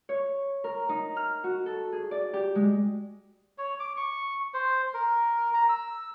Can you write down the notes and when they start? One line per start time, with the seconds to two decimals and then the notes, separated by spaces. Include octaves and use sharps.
0.09 C#5
0.64 A#4
0.89 D#4
1.17 F6
1.44 F#4
1.66 A4
1.92 G#4
2.11 D5
2.33 G4
2.55 G#3
3.58 C#5
3.80 D6
3.97 C#6
4.54 C5
4.94 A#4
5.54 A#5
5.69 E6